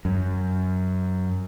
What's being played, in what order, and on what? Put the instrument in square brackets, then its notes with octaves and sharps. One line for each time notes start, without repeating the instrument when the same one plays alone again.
[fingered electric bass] F#2